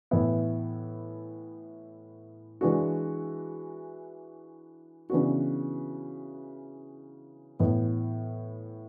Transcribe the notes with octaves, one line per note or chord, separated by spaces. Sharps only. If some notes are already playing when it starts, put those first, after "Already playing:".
A2 E3 B3 E4
E3 G#3 D4 F#4
C#3 E3 B3 D4 F#4
A2 E3 B3